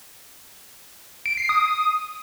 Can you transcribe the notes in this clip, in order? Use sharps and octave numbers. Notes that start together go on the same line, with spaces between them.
D7
C7
D#6